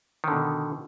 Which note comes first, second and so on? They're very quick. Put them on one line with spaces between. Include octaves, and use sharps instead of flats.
D#3 D3 B2